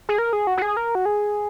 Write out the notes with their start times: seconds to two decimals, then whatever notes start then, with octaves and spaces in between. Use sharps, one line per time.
0.09 G#4
0.18 A#4
0.33 G#4
0.47 F#4
0.57 F#4
0.62 G#4
0.77 A#4
0.95 F#4
1.05 G#4